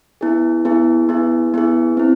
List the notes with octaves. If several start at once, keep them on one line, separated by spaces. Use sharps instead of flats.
B3 E4 G#4
B3 E4 G#4
B3 E4 G#4
B3 E4 G#4
C4 E4